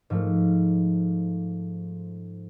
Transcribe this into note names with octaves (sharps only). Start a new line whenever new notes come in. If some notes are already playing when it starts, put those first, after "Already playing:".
G#2 F3 A3